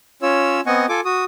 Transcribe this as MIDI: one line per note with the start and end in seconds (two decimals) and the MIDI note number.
0.22 0.61 61
0.22 0.61 65
0.22 0.61 73
0.22 0.61 88
0.66 0.86 59
0.66 0.86 60
0.66 0.86 75
0.66 0.86 78
0.66 0.86 80
0.66 0.86 85
0.89 1.01 65
0.89 1.01 69
0.89 1.01 80
0.89 1.01 86
1.05 1.25 66
1.05 1.25 87